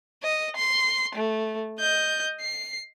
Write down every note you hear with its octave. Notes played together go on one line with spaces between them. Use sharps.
D#5
C6
A3
D#5 G6
C7